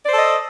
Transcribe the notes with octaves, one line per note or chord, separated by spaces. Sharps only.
A4 C5 D5 D#5